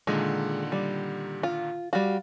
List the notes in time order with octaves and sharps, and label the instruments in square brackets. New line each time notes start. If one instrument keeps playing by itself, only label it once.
[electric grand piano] A#2 D3 D#3 [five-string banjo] G#3
[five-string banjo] G3
F4
[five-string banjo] G3 F#4 [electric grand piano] F5